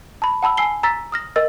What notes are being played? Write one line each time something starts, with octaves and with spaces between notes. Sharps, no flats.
A5 B5
F#5 A5 B5 E6
G#5 E6 C7 G7
A#5 E6 A6 B6
D#6 F6 A#6
A#4 D#5 E6 A6